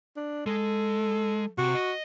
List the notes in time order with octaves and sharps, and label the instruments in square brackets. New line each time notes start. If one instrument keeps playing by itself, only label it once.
[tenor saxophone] D4
[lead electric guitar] G#3 [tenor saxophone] A4
[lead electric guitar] C3 [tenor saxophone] F#4
[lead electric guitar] D#5